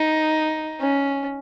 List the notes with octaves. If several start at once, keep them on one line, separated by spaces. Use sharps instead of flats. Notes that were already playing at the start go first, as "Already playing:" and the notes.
Already playing: D#4
C#4